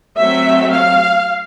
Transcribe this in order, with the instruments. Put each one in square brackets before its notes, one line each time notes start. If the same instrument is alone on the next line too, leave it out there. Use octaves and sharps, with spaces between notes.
[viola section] F#3 A3 C4 E5
F5